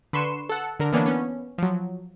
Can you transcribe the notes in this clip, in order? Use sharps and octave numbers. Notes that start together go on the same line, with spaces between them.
D3 B4 C6 C#6 E7
A4 F#5
D3 A#4
E3 A#3 B3 C#4 D4
B3 C#4
F3 F#3